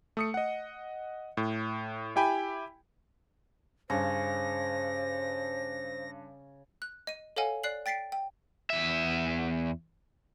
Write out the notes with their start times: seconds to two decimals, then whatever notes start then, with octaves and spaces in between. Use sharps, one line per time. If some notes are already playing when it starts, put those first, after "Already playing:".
0.17 A3 D#6 C#7
0.34 D#5 F#5
1.37 A2
2.16 E4 G4 G5 G#5 B5
3.90 G2 C#3 C5 A#6
6.82 F#6
7.07 D#5 D#7
7.36 A4 C#5 D#5 F5 F#5 G#5
7.63 D5 F#6 C7 F#7
7.86 G5 A6 B6 C7 D7
8.12 G5
8.70 E2 E5